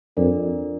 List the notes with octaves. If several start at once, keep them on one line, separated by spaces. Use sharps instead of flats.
F2 D4 F4 A#4 D5